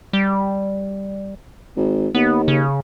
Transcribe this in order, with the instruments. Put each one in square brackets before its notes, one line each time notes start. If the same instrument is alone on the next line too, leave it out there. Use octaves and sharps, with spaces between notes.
[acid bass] G3
[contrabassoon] G#1
[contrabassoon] D#2 [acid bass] B3
[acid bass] C#3